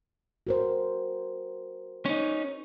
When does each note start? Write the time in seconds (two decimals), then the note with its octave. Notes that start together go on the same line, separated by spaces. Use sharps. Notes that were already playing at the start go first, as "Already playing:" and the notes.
0.47 F#4 A#4 C5
2.05 C#4 D#4